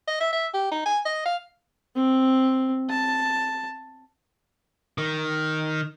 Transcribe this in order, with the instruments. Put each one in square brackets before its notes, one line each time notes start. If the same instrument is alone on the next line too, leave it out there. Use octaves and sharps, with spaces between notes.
[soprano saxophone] D#5
E5
E5
G4
D#4
G#5
D#5
F5
[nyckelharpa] C4
A5
[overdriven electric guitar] D#3